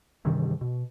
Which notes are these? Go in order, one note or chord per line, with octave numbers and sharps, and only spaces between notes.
G2 C3 D#3 E3
B2